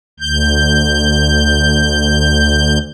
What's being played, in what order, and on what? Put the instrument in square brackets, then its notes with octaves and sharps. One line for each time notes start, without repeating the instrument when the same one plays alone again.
[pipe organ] D2 G6